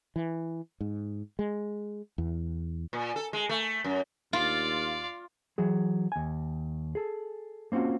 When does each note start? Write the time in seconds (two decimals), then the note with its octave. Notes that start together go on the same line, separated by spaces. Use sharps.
0.16 E3
0.81 G#2
1.39 G#3
2.18 E2
2.93 A#2
3.16 A4
3.33 G#3
3.49 A3
3.84 F#2
4.33 D#2 F4 D5 F5
5.58 E3 F#3 G#4
6.12 D#2 G#5
6.95 G#4 A4
7.72 A#3 C4 C#4 F4 F#4